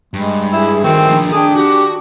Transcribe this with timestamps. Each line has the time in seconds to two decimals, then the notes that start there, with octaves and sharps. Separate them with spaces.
0.14 G2 G#3
0.53 E4 G#4
0.84 D#3 A3 C4 F#4
1.07 F3 D4
1.32 D4 G#4 A4 G5
1.55 F#4 G4